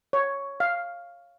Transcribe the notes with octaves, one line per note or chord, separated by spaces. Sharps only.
C#5
F5